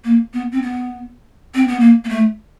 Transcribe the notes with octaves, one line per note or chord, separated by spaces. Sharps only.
A#3
B3
C4
B3
C4
B3
A#3
A#3
A3